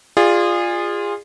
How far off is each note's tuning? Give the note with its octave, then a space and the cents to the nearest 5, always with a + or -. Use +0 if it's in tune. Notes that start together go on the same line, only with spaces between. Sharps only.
F4 +0 G#4 -25 D5 +20